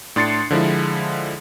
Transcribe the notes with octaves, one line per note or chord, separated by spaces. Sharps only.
A2 D4 C6 A6 C7 C#7
D3 F3 G#3 E4